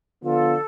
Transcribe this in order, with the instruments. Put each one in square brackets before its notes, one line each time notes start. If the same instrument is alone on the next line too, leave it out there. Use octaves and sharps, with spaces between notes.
[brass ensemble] D3 F3 B3 D4 F4 [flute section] A4